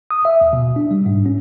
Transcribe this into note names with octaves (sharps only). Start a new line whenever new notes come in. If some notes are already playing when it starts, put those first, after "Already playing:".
D#6
E5
D#2
B2
D4
G3
G#2
C#4